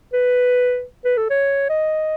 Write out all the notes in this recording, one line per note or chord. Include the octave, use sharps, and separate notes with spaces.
B4
B4
A4
C#5
D#5